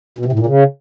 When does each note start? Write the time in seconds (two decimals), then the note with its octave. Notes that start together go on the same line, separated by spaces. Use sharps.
0.18 B2
0.25 C3
0.32 A2
0.39 A#2
0.46 C#3